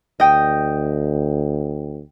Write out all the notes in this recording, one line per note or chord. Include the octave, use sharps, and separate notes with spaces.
D2 D#5 G5